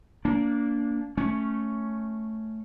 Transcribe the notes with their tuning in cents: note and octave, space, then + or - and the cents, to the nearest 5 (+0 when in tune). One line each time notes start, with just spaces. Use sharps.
A#3 +0 D4 -25
A3 +0 C#4 +0